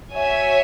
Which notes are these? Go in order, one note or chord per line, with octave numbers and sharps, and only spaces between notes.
F#4 C#5 E5 G#5